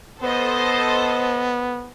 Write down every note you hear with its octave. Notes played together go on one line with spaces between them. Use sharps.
B3 A4 C5 D#5